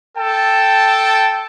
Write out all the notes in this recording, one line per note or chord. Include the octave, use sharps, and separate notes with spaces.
A4 G5 A5